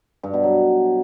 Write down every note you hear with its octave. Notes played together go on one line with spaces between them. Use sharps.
G2
B2
F#3